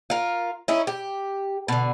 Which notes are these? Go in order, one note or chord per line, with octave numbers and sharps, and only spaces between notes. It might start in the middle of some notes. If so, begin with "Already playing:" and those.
F4 A#4
C#4 D#4 E4
G4
B2 D3